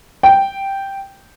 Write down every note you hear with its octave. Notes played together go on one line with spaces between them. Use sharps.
G5